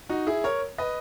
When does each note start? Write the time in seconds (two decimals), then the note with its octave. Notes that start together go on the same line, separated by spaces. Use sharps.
0.09 D#4 F#4
0.27 E4 G#4
0.44 A#4 C#5
0.78 B4 D#5